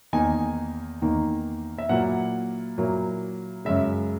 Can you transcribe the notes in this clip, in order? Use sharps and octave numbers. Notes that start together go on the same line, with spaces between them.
E2 D#3 A#3 D#4 G#5
E2 D#3 A#3 D#4
E5
A#2 F#3 A#3 E4 F#5
A#2 F#3 A#3 E4
F#2 C#3 G#3 E5